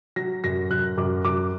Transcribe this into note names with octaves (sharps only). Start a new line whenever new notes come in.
F#3 A#6
F#2 A#6
F#2 F#6
F#2 D6
F#2 D6